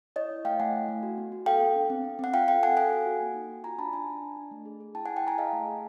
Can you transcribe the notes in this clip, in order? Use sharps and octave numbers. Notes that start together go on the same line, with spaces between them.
E4 C#5 D#5
E4
A3 F5 G5
A3 F#5 G#5
E4
A3
F#4
B3
F#4
A4 F5 G5
B3
D4
C4
C4
C4 F#5
F4 F5 G5
A4 F5 G5
A4 F#5 G#5
A4 F#5 G#5
F#4
F#4
A#3
D#4
F#4
F4 G#5 A#5
D4 A5 B5
D4 G#5 A#5
D4
D4
D4
A3
G#4
G#4
E4 G5 A5
F#5 G#5
E4
G5 A5
E4 G#5 A#5
G#4 D#5 F5
A3
G#4